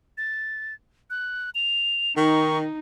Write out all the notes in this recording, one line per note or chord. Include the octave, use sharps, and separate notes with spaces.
A6
F#6
F7
D#3 D#4 C#6